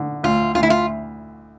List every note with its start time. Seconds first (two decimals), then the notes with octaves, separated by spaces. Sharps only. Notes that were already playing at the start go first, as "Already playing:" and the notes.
Already playing: D3
0.23 D2 F4
0.55 D2 F4
0.63 E4
0.70 F4